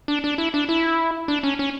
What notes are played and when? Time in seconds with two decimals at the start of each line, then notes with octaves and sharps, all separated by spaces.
0.08 D4
0.24 D4
0.38 E4
0.54 D4
0.69 E4
1.28 D4
1.43 C#4
1.59 C#4